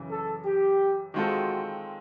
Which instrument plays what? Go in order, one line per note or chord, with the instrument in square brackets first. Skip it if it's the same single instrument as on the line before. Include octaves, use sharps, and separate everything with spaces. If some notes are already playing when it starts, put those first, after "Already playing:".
Already playing: [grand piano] F#2 C#3 E3
[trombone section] A4
G4
[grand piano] D#3 G#3 C4 F4 A4 [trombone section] F#4